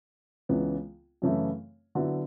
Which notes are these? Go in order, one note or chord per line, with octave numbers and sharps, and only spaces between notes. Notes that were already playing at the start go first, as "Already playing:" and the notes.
C#2 C#3 E3 B3
F#2 C#3 E3 A3 E4
D3 F#3 B3 E4